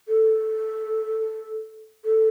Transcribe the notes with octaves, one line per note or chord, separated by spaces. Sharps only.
A4
A4